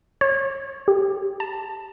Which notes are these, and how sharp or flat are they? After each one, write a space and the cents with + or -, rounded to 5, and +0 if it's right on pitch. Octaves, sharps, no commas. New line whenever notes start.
C#5 -30
G4 +0
A5 +5